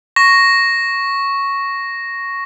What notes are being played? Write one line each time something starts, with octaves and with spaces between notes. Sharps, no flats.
C#6 A#6